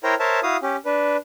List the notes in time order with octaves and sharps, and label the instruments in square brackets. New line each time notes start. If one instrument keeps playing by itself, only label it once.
[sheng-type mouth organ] E4 A#4 C5 C#5 G5 A#5
A#4 C5 C#5 E5 A5
E4 F#4 F5 D#6
C#4 G4
D4 B4